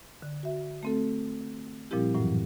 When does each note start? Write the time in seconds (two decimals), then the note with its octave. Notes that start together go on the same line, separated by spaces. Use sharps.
0.22 D3
0.43 F#4 E5
0.83 A3 C4 A4
1.91 A#2 F3 G3 C4 E4 G4
2.14 F#2 A2 E3 F#3